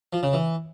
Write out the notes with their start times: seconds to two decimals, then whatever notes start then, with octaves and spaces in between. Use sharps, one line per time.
0.13 F3
0.23 C#3
0.33 E3